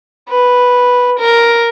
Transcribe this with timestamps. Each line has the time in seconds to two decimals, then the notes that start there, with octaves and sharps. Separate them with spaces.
0.29 B4
1.19 A#4